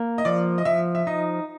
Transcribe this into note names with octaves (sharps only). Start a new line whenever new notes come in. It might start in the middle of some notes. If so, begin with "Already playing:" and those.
Already playing: A#3
D#5
F3 D5
D#5
F3 E5
E5
D#4 D#5